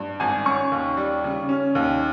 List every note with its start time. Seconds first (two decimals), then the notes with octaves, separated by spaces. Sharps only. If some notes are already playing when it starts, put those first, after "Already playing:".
Already playing: G2
0.20 G#1 G#5
0.45 C#4 C#6
0.72 D#2
0.97 G3
1.24 C#3
1.49 C#4
1.75 D#2